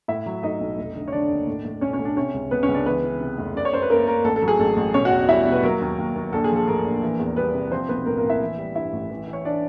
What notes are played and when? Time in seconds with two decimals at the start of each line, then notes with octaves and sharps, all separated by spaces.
0.08 A2 E4 E5
0.26 F#3
0.43 A2 D#4 D#5
0.61 B1
0.78 F1
0.95 D3
1.08 C#5
1.12 D3 D4 D5
1.30 D#2
1.47 A2
1.65 A2
1.81 B1 C#4 C#5
1.93 C#4 C#5
1.99 A2
2.05 D4 D5
2.17 C3 C#4 C#5
2.34 C#2
2.51 C#2 B3 B4
2.63 C#4 C#5
2.68 C#2
2.74 D4 D5
2.86 E3 B3 B4
3.04 E3
3.20 C3
3.38 F1
3.55 F#2 D5
3.65 C#5
3.73 F#2 C5
3.82 B4
3.90 F#2 A#3 A#4
4.07 F#2 A#3 A#4
4.25 A1 A4
4.36 A4
4.42 F#3
4.48 G#4
4.59 A1 A4
4.77 A1
4.94 B2 C#4 C#5
5.05 F#4 F#5
5.11 E2
5.29 G3 E4 E5
5.46 B2
5.52 B4
5.63 F#3 A#3 A#4
5.81 D#2
5.98 D#2
6.16 D#2
6.33 A#1 A4
6.44 G#4
6.50 F3
6.56 A4
6.67 A2 A#3 A#4
6.85 A#1
7.02 E3
7.19 E2
7.36 G3 B3 B4
7.54 C3
7.71 F3 C4 C5
7.89 B1 B3 B4
8.06 A2 A#3 A#4
8.17 A#3 A#4
8.24 A2
8.29 E4 E5
8.41 E3
8.58 G3
8.75 G2 E4 E5
8.93 A1
9.10 E3
9.27 E3
9.33 C#5
9.45 E3 D4 D5